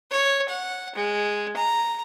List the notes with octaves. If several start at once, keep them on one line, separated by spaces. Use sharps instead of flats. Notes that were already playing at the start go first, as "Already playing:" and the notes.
C#5
F#5
G#3
A#5